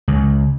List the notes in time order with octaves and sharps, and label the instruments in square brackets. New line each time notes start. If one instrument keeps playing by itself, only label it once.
[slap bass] C#2